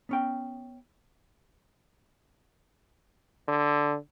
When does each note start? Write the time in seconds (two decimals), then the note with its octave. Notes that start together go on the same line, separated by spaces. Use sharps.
0.09 B3 C#4 G5
3.48 D3